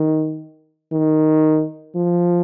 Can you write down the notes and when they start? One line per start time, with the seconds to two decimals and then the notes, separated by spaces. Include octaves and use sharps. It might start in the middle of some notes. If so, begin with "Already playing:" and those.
Already playing: D#3
0.92 D#3
1.96 F3